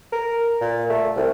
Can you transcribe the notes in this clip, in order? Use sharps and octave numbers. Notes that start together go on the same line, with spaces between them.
A#4
A#2
A3
C2